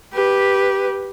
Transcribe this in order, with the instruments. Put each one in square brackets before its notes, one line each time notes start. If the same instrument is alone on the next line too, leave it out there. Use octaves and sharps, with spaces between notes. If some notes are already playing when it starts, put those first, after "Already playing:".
[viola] G4 B4